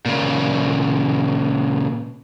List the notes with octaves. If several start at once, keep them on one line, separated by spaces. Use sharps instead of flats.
A#2 C#3